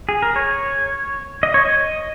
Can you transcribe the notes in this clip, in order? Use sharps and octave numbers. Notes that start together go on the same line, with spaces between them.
G#4
A#4
C#5
D#5
C#5
D#5